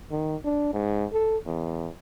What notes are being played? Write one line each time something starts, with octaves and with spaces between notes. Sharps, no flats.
D#3
D4
G#2
A4
E2